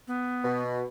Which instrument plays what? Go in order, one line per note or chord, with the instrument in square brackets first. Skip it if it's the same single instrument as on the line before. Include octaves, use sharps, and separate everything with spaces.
[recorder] B3
[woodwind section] B2